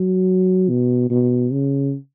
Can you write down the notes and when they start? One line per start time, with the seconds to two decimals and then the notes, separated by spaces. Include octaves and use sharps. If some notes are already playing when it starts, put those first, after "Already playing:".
Already playing: F#3
0.69 B2
1.10 B2
1.52 C#3